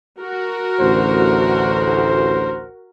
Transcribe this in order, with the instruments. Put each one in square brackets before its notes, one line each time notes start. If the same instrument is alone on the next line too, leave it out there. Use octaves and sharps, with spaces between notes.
[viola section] F#4 A#4
[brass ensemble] A1 D2 [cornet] C5